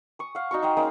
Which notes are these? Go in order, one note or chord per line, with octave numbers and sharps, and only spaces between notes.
C#6 D#6
F5 F#5
D#4 F#4 C#6
D#4 C5 F5 G5
G#3 A#3 C#4 D#4